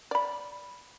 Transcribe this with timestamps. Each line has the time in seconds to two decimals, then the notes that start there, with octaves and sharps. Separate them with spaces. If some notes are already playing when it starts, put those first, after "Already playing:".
0.11 D5 B5